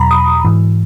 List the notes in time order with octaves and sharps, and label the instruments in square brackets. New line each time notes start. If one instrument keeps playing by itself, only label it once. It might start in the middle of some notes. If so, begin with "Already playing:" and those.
Already playing: [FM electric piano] E2 B2 F#3 A#5 B5
D#6
G#2 E3